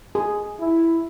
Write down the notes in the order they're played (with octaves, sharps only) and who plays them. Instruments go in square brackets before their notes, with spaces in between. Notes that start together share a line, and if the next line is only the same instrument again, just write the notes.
[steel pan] G#4
[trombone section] E4